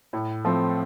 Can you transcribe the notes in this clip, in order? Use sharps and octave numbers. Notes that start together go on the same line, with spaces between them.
A2
F3 A3 C4